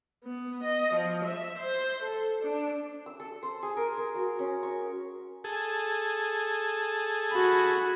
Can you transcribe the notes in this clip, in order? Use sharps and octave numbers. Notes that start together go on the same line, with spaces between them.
B3
D#5
F3
E5
C5
A4
D4
E6
A4
C5
G#4
A#4
A#4
F#4
C#4
C#6
G#4 A4
F#4 B5